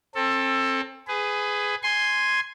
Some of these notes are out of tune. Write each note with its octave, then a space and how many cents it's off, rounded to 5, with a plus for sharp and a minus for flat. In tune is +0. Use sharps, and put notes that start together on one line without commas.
C4 +30 A4 +10
G#4 +0 B4 +25
G#5 +0 C6 +0